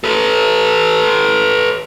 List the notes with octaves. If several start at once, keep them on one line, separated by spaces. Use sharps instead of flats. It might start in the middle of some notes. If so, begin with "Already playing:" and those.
A4 B4